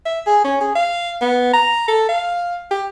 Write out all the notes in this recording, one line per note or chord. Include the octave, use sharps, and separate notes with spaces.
E5
G#4
C#4
G#4
F5
B3
A#5
A4
F5
G4